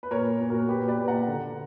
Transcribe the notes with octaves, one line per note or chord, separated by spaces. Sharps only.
B4
A#2 A#4 C#5
A#2
F#4 A#4
A#2 G4 B4
B4 D5
A#2
F#5 A#5
D3